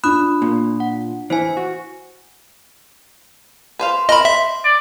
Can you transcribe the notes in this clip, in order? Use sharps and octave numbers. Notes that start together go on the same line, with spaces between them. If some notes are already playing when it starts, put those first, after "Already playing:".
D4 F4 B5 D#6 F#6
A#2
F#5
E3 E4 C5 G#5
F#4
B4 C5 F5
C4 A#4 B4 D#5 B5
C5 E5
D5